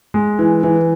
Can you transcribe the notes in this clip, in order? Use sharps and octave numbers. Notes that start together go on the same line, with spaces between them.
G#3
E3
E3